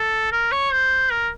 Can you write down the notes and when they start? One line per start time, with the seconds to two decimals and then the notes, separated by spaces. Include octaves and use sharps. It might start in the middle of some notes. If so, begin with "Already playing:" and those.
Already playing: A4
0.32 A#4
0.52 C#5
0.72 C5
1.11 A#4